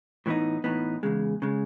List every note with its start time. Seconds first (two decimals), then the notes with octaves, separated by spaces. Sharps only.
0.26 A2 E3 B3 D#4
0.64 A2 E3 B3 D#4
1.03 E2 C#3 G#3
1.42 C#3 G#3